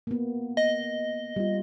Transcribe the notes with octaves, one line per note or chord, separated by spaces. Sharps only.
A#3 B3
D#5
G3 F4